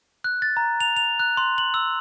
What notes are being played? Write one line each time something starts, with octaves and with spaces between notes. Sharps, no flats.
F#6
A6
A#5
F7
F7
F#6
C6
F#7
E6